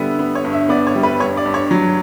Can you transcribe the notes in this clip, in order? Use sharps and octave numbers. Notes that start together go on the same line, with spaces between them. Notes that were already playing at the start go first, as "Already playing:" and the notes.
Already playing: D3 G3 B3 E5
B3
C#5
G2
E5
B3 D5
C#5
G3
B4
G2 C#5
D5
G2
C#5
F#3